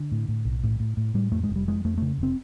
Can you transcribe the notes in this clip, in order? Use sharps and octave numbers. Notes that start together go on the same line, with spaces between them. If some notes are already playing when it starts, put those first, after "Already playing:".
Already playing: D3
A2
A2
B1
A2
A2
A2
A2 G3
F2 A3
G#3
F1
G3
F2 G#3
F2 A3
C#3 A3
F1 C4